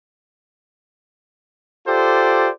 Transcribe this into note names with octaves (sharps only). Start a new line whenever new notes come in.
F4 G4 A4 C5 D5